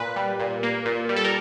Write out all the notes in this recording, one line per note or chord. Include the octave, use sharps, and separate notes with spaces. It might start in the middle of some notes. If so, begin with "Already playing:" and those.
Already playing: A#2 A#3 B4
G3
A#2
A#3
A#2
G3
A4
A#4